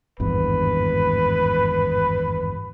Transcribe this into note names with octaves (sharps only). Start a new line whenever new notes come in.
G#1 E2 G2 B4